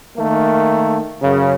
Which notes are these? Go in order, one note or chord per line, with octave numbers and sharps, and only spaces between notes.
D#3 A3 A#3
F#2 C#3